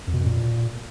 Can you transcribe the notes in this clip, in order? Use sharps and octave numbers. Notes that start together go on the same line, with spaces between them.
F2
B2
F#2
A#2